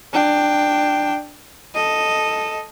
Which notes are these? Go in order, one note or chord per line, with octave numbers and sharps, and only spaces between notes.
D4 G5
A4 D#5